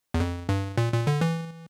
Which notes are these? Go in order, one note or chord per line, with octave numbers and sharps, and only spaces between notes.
E2
F2
G2
A#2
A#2
D3
E3